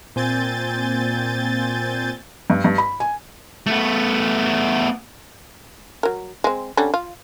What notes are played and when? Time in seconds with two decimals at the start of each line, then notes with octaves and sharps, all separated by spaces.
0.16 A#2 C4 G#5 G6 A6
2.50 G2
2.64 G2
2.78 B5
3.00 G#5
3.66 A3 B3
6.03 F#3 A#4
6.44 G#3 C4
6.77 D3 G3 C#4
6.94 F4